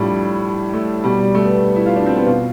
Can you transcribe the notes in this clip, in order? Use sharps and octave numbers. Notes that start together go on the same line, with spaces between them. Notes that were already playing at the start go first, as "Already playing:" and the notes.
Already playing: A2 F3 G3 D4
A3
B2 G3
G3
A3
B3
E4
F4
D4
C4
B3
B2 F4